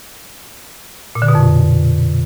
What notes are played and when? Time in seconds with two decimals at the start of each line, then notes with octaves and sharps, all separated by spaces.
1.15 A#2
1.22 D3
1.28 B2
1.35 F2